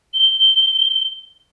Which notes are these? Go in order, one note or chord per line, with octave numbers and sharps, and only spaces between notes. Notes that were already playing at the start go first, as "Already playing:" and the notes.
G7